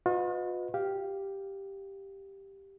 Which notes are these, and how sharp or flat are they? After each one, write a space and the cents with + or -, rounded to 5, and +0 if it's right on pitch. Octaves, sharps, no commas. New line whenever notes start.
F4 +45 B4 +10 D#5 +0
G4 +0 F5 +0